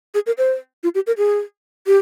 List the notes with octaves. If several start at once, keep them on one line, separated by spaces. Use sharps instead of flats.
G#4
A#4
C5
F4
G4
A#4
G#4
G4